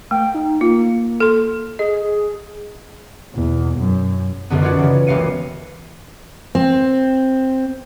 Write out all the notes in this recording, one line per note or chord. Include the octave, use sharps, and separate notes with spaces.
A3 G5
D#4
A#3 F4
A4 C6
G#4 D#5
E2 B2
F#2
B1 F#2 D3 B3
F4 C#5 D5 F#5
C#3 E3
F#1 C#2 F5 C#7 D#7
C4